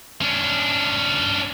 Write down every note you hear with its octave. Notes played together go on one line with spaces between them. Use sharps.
C#4 D4